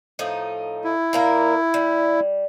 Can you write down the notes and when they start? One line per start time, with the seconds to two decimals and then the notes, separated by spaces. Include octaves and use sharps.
0.19 A2 F3 D#4
0.84 E4
1.13 A#2 A#3 A#4
1.74 G3